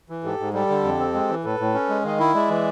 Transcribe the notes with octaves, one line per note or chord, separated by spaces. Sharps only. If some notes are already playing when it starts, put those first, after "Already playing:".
E3
G#2 G4 A4
G#2
G3 G4 A4
D3
F2
C4
G#3
E3
A2 A4 B4
A2
C#4
G#3
D#3 D#5 F5
E4
G#3 D5 E5
E3